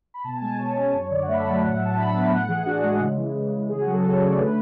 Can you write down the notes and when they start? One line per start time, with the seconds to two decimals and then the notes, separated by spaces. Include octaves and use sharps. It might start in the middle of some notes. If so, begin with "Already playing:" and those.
0.14 B5
0.24 B2 A5
0.36 G#5
0.41 G#3 A5
0.59 B2 C#5
0.76 C#4
0.93 F#2 C#5
1.10 D3 D5
1.23 F#5
1.28 A3 E5
1.34 B5
1.39 A5
1.45 F#3
1.51 A5
1.62 A2 F#5
1.73 E5
1.79 F#3
1.85 A5
1.97 D4 B5
2.14 B3 A5
2.31 A2 F#5
2.48 E3 G#4
2.66 D4 F#4
2.83 G#3 G#4
3.00 C#3
3.17 E3
3.35 C#3
3.52 G#3
3.69 C#3 G#4
3.81 F#4
3.86 F#3
3.92 A4
4.04 C#4 A4
4.13 C#5
4.21 A3 D5
4.38 D3 B4